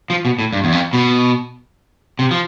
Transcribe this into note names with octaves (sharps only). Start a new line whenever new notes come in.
F3
B2
A2
G2
E2
F2
B2
C3
F3